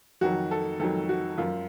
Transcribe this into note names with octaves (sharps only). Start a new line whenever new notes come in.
F2 D#3 F#3 F#4
A4
F2 D#3 F#3 A4
F#4
F#2 F3 F4